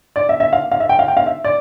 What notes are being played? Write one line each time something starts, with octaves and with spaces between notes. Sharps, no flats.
D5
E5
E5
F5
F5
E5
G5
F5
G5
F5
E5
D5